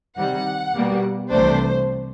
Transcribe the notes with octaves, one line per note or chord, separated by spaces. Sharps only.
C3 D#3 G3 F#5
B2 G3 A#3
C2 C3 E3 A3 D4 C5